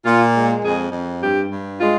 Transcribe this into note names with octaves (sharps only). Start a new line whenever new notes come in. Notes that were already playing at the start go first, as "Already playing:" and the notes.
A#2 F4
G#3
F2 G#4
F2
G2 G4
G2
G#3 F4